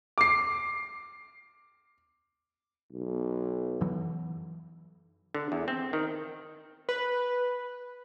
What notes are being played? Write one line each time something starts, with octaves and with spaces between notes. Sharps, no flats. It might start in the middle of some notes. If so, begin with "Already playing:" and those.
D6 C7
B1
F#2 E3 F#3
D3
E2
C4
D#3
B4